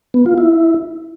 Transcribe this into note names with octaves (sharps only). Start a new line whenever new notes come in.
B3
F4
E4